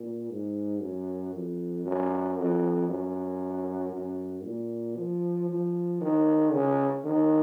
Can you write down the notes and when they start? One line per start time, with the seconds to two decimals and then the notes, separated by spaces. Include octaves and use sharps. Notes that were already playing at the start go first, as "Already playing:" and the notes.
Already playing: A#2
0.30 G#2
0.81 F#2
1.34 F2
1.85 F#2
2.38 F2
2.89 F#2
3.93 F#2
4.45 A#2
4.97 F3
5.49 F3
6.01 D#3
6.53 C#3
7.05 D#3